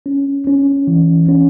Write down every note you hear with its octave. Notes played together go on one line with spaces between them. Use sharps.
C#4
C#4
E3
C#4